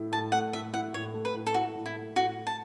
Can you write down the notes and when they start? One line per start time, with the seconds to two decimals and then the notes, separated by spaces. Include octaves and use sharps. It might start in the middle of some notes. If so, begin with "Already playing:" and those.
Already playing: A2 E4
0.12 A2 A5
0.32 A3 F#5
0.53 A2 E5
0.73 E4 F#5
0.93 A2 C#5
1.14 A3
1.25 B4
1.34 A2
1.47 A4
1.54 E4 F#4
1.75 A2
1.86 E4
1.96 A3
2.16 A2 F#4
2.36 E4
2.47 A5